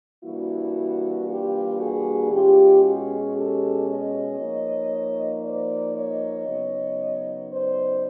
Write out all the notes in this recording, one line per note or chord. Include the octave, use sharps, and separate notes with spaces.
E3 G3 A#3 D4 E4 F#4
F4 G4
F#4 G#4
B2 G#3 C#4 F4 G4
F#4 G#4
G4 A4
C#5 D#5
F3 A#3 D#4
C5 D5
C#5 D#5
C#3 F#3 B3 D#4
C5 D5